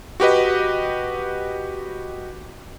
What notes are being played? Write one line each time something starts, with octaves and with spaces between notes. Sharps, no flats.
F#4 G4 B4 D#5